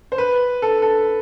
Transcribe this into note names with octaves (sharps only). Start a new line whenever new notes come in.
C5
B4
A4
A4